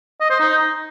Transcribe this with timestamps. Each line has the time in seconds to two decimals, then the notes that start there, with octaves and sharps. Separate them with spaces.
0.20 D#5
0.30 C5
0.40 D#4